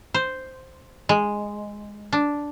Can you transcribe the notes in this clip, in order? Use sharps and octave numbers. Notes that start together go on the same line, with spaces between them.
C5
G#3
D4